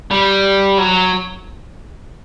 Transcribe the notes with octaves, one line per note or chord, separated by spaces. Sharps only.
G3
F#3